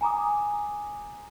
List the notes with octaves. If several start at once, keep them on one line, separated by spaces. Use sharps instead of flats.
G#5 A#5 D6 D#6